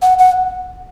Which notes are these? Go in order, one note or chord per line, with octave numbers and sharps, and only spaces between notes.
F#5
F#5